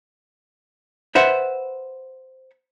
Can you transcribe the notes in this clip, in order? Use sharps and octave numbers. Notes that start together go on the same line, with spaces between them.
B4 C5 E5 F#5